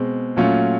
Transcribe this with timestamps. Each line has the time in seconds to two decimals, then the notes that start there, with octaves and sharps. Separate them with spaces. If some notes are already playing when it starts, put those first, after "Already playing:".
Already playing: B2 G#3 C4
0.36 A#2 F#3 A3 C#4 F4